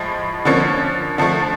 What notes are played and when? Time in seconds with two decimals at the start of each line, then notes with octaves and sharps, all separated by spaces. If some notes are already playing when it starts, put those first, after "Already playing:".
Already playing: A2 F3 G#3
0.45 D3 F3 A#3 C#4
1.18 D3 F3 A3